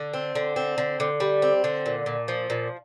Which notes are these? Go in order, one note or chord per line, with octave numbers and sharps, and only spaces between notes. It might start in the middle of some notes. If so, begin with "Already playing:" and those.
Already playing: D3
C4
D3
C4
D3
D3
G3
C4
D3
A#2
A#2
F3
A#2